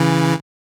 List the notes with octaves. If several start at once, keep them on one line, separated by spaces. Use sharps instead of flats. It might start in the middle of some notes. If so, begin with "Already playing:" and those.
Already playing: C#3 E3